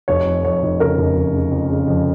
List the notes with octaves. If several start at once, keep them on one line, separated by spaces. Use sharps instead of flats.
F1 C#5
F2
F2 C#5
F1
C#3 A#4
F1
F1
C#3
F2
C#3
F2